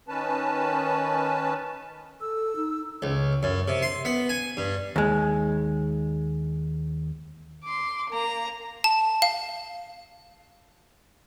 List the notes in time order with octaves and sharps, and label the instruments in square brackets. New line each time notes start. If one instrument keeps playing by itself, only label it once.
[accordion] D#3 C#4 B4 A5
[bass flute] A4 [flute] E6
[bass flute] D#4
[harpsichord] C#2
F#2
C3
C6
B3
G#5
G2
[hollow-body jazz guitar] D#2 G#3
[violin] C6 D6
A#3 A#5
[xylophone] A5
F5